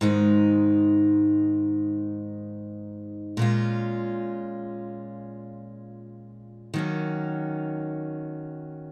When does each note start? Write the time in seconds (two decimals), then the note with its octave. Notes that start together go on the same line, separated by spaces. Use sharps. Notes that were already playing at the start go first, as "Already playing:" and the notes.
0.01 G#2 D#3 G#3 D#4
3.37 A#2 G#3 C#4 F4
6.74 D#3 F#3 A#3 C#4